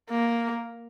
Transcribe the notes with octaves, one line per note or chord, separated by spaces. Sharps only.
A#3